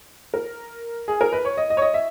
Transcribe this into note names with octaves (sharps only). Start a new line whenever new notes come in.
A#4
G#4
A#4
B4
C#5
D#5
D#5
C#5
D#5
E5